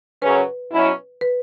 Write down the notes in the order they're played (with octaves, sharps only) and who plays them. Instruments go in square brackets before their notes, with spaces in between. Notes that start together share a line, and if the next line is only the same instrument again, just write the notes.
[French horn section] F#2 C#3 F#3 C#4 [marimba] B4
[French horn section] B2 F#3 C#4 E4
[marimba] B4